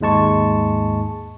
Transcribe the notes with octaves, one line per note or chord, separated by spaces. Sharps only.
D#2 G#2 G#3 A5 C#6